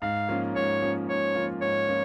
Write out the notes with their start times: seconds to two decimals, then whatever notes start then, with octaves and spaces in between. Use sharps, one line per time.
0.02 G#2 F5
0.29 F3 A#3 C#4 F4
0.55 G#2 C#5
0.82 F3 A#3 C#4 F4
1.08 G#2 C#5
1.35 F3 A#3 C#4 F4
1.61 G#2 C#5
1.87 F3 A#3 C#4 F4